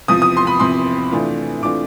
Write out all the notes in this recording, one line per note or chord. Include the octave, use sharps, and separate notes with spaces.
E2 C3 F3 D#6
D#6
C6
B5
E2 C3 F3 C6
C3 E3 A3 D4 F4
C3 E3 A3 D4 F4 D6